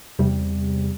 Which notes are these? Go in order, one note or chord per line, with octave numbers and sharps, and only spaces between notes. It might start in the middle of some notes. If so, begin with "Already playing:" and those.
E2 C3 G3